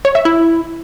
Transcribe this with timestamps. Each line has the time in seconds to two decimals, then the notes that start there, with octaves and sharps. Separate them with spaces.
0.05 C#5
0.15 E5
0.25 E4